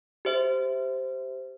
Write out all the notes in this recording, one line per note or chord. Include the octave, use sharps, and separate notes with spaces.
G4 C5 E5